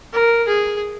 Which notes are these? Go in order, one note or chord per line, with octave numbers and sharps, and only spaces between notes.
A#4
G#4